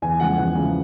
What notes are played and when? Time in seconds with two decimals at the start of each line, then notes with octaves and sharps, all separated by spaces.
0.02 E2 G#5
0.20 C#3 F3 G#3 F#5
0.37 E2 F#5
0.55 C#3 F3 G#3